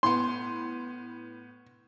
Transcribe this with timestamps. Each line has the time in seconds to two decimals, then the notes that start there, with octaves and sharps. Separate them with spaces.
0.03 A2 B3 C6